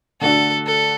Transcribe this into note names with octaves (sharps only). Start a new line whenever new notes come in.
D3 A3 D4 F#4 A4
A4